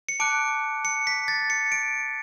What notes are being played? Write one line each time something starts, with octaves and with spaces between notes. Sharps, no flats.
C#7
A5 D6 F#6 D7
C#7
B6
A6
C#7
D7